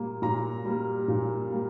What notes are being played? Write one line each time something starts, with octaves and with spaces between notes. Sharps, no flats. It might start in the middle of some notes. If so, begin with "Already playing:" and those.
Already playing: A#2 G3 A#3
A#2 A#5
G3 A#3
A#2
G3 A#3